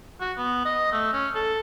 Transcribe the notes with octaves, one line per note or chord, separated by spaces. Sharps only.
F#4
B3
D#5
A3
C#4
A4